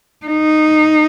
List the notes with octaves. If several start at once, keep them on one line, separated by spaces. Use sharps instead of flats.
D#4